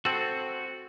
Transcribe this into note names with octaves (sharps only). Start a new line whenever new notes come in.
C4 F#4 A4